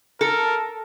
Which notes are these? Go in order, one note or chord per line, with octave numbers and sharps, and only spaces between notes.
A4 A#4